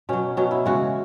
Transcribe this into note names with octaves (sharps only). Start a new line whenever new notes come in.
B2 F#3 C#4
B2 F#3 C#4
E4
C#3 E3 G#3 F#4